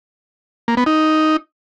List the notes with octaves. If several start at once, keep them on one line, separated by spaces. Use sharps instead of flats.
A#3
B3
D#4